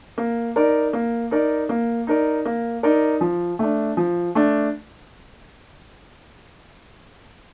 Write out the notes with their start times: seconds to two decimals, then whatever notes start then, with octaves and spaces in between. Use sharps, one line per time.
0.18 A#3
0.56 D#4 A#4 D5
0.93 A#3
1.31 D#4 A#4 D5
1.69 A#3
2.07 D#4 A#4 D5
2.45 A#3
2.83 D#4 A#4 D5
3.21 F3
3.59 A3 D4
3.97 F3
4.35 A3 D4